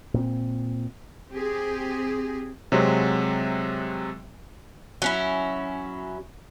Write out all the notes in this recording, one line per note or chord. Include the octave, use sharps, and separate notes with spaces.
A#2 C4
C4 G4 G#4
C3 F#3 G#3 C4
F#3 C#4 E4